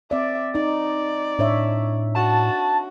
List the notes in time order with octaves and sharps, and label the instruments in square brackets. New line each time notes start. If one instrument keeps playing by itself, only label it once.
[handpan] C4 D5 [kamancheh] E5
[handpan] D#4 [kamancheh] D5
[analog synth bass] A2 [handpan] D4 C#5 E5
[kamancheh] F#4 [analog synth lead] A5